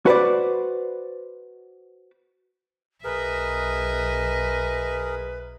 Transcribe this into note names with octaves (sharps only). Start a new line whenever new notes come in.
F#4 B4 C5 D5
B1 G#4 A#4 B4 D#5 E5